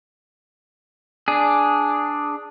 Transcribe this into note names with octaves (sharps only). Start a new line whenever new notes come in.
D4 G#4